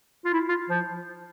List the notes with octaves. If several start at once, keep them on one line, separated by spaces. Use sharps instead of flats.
F4
E4
F4
F3